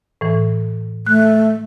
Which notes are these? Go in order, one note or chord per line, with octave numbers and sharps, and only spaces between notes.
A2 E3
A3 F#6